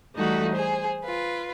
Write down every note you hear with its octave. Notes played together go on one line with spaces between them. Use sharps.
E3 G3 A3 D#4 F#4 A4
G#4 C5
F4 B4